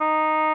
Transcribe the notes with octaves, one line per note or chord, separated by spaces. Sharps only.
D#4